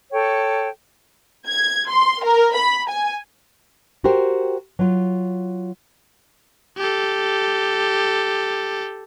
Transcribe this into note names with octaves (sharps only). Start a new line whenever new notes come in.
A4 C#5 G5
G#6
C6
A#4
B5
G#5
F#4 G4 A#4 C5 G5
F#3 F4
G4 A4